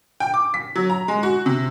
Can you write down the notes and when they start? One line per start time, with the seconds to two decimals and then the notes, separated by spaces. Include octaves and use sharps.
0.20 G5
0.34 D6
0.54 B6
0.76 F#3
0.90 A#5
1.08 G#3
1.23 F#4
1.46 C3